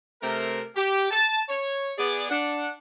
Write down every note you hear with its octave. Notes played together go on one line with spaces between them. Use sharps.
C3 A3 C4 A#4
G4
A5
C#5
B3 G#4 D5
D4 F#5